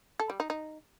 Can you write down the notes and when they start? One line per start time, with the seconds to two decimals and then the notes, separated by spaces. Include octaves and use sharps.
0.20 A4
0.30 G3
0.40 D#4
0.50 D#4